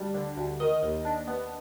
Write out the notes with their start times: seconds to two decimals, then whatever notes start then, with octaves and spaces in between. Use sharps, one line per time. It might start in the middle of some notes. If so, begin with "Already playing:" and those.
Already playing: D2 G3 D4
0.14 D3
0.37 D2
0.60 D#3 D#5
0.83 D#2
1.05 D4
1.28 B3